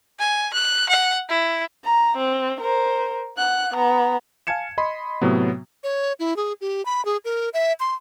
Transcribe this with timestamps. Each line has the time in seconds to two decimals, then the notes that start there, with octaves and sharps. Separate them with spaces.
0.19 G#5
0.53 F#6
0.89 F#5
1.29 E4
1.84 A#5
2.17 C4
2.61 A#4 C5
3.37 F#5 F#6
3.74 B3 A#5
4.47 F5 G#5 A5 G#6 C#7 E7
4.78 D#5 B5 C6
5.22 A2 C3 F#3 B3
5.84 C#5
6.19 E4
6.36 G#4
6.61 G4
6.85 B5
7.05 G#4
7.25 A#4
7.54 E5
7.80 C6